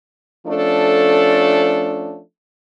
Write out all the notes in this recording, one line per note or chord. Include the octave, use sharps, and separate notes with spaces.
F3 A3 C#4 D4 A4